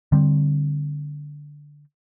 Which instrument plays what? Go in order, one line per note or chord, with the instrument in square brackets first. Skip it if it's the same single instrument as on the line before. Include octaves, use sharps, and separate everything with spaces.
[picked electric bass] D3 G3 C4